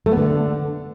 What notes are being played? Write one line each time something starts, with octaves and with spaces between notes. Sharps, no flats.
A3
B3
D3